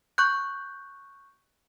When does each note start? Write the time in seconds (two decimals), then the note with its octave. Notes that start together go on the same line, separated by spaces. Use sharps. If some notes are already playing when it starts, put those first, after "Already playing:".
0.18 C#6 F#6 G6